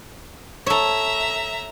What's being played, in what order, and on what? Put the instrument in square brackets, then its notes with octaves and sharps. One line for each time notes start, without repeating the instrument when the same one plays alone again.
[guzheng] A4 C#5 [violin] E5 A#5